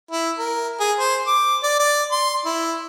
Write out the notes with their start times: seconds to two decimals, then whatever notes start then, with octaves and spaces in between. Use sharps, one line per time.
0.11 E4
0.39 A#4
0.80 G#4
1.00 C5
1.27 D6
1.63 D5
1.80 D5
2.11 C6
2.46 E4